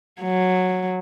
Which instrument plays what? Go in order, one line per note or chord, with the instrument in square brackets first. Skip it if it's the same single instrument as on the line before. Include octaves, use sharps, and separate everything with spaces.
[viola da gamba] F#3